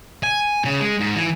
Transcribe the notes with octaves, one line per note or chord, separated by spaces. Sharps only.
G#5
C#3
G#3
G#2
E3